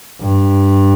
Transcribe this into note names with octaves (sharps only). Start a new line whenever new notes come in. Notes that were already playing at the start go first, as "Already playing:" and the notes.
G2